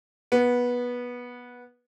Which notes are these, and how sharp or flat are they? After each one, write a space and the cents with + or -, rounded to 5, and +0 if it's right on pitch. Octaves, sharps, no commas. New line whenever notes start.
B3 -15